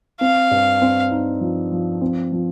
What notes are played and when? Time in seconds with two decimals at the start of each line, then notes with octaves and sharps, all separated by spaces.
0.21 C4 F5
0.51 G2
0.82 C4
1.11 D#4
1.41 F3
1.72 F3
2.01 C4
2.32 F3